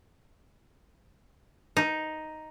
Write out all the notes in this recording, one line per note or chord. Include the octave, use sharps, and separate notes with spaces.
D#4